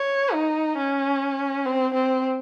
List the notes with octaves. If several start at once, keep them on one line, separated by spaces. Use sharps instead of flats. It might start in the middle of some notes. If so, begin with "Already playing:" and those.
Already playing: C#5
D#4
C#4
C4
C4